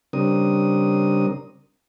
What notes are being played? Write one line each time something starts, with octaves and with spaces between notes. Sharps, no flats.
C#3 G3 C4 D4 A#4 D#6